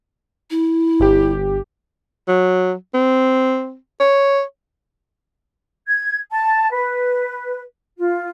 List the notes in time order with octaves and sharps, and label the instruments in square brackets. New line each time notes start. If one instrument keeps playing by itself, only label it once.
[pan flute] E4
[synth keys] G1 G4
[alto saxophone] F#3
C4
C#5
[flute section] G#6
A5
B4
F4